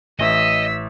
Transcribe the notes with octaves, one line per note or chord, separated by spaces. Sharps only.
A1 D#5 E5 E6 B6